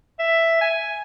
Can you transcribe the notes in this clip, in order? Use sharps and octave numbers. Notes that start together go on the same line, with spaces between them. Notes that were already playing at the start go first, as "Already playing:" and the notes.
E5
G#5